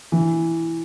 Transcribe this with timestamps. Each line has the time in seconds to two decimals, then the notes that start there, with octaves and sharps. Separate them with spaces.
0.12 E3